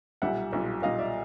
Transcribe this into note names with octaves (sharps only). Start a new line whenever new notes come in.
B1 A#2 G3 E5 F#5
B1 A#2 G3
B1 A#2 G3 D#5 F5
D5 E5